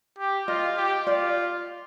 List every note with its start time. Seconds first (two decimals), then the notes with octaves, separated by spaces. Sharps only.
0.18 G4
0.48 F4 D#5
0.77 G4
1.06 F4 D5